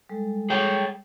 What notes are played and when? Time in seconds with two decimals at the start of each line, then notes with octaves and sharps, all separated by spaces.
0.09 G3 G#3 A4
0.50 G#4 C#5 G5